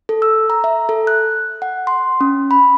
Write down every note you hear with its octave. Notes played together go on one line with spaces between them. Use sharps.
A4
E6
A#5
E5
A4
F#6
F#5
C6
C#4
B5